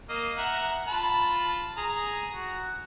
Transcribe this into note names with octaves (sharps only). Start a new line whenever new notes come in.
A#3 D#5
E5 F#5 A#5
F4 A5 B5
G#4 A#5
F#4